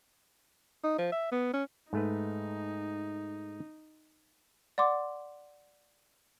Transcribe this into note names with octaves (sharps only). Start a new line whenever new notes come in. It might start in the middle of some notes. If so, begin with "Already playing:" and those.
D#4
F3
E5
B3
C#4
G#2 A3 D#4 B4
D5 F#5 C6 D6